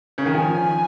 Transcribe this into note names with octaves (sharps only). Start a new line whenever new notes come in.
C#3
D#3
F3 G#5